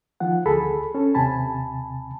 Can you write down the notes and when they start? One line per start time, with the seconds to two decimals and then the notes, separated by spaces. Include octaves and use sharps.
0.20 D#3 F3 F4 F#5
0.46 D2 G#4 A4 B5
0.94 C#4 A4
1.15 D#2 C3 G#5 A5 B5